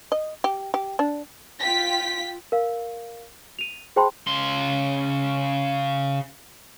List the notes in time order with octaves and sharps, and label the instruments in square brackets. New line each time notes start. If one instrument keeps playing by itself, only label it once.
[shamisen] D#5
G4
G4
D4
[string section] F4 G5 B6
[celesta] A#4 F5
D#7 F7
G#4 C5 G5 A5 B5 C6
[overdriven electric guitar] C#3 C6